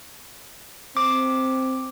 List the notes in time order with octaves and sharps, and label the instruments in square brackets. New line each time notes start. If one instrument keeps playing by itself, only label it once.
[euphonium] C4 [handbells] D6